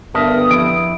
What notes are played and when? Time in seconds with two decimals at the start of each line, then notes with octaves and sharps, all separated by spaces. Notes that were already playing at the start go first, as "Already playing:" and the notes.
0.14 G2 D3 B3 A#4 E5 A5 D#6
0.50 F2 E4 D7